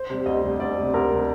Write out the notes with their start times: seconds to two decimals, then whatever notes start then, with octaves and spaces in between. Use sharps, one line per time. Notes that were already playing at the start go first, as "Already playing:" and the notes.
Already playing: C5
0.10 C3 G3
0.26 D2 D#5
0.43 C3 G3
0.60 D2 D5
0.77 C3 G3
0.94 D2 A#4
1.11 C3 G3